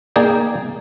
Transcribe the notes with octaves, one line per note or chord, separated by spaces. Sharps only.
A#3 D#4 G#4 D5 G5